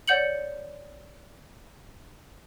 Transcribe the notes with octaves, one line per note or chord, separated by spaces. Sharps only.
C#5 D5 F#5 G6 C#7 F#7